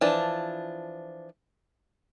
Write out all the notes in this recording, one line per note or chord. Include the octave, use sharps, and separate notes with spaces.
E3 F3 D4